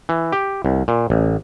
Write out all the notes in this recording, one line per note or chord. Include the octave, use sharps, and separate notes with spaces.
E3
G4
C2
A#2
A1